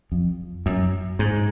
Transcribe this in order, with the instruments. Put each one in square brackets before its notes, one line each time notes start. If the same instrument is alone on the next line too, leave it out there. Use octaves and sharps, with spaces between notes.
[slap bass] F2
F#2
G#2